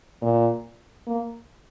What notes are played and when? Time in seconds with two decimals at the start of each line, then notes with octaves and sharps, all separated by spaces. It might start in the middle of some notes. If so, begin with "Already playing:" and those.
0.21 A#2
1.07 A#3